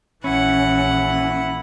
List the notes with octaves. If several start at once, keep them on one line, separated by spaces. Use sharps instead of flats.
A#1 E3 C#4 E4 F#5